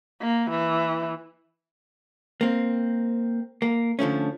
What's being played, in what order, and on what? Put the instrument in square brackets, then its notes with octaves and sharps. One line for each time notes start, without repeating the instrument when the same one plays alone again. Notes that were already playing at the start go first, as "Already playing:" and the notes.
[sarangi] A#3
E3
[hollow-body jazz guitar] A#3 C4
A#3
D3 F3 A3 C#4